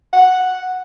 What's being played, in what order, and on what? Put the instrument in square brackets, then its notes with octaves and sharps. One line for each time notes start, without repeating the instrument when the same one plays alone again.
[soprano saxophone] F#5